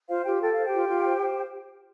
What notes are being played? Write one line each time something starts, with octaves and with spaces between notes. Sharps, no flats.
F4 C5 F5
F4 G4 G5
A4 G5
C5 F5
G4 G5
F4
F4
C5
C5